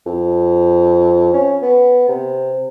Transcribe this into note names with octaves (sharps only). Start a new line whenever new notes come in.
F2
C#4
B3
C3